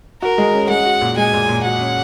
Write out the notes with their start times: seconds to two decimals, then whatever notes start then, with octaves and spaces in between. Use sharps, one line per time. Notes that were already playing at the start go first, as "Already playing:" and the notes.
0.22 F#4 A#4
0.38 G#3
0.54 C#4
0.69 G#3 F#5
0.85 F#4
1.01 A#2
1.17 G#3 G#5
1.33 A#2
1.49 A#2
1.65 F#4 F#5
1.81 C#4